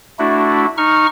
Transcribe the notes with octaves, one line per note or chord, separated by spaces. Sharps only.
A3 D4 E4 F#4
D#4 C#6 F6